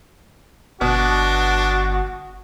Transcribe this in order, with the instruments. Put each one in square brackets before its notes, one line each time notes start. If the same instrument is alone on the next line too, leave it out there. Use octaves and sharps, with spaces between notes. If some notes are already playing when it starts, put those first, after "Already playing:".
[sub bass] G1 [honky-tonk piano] B2 [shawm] D4 [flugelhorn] F#4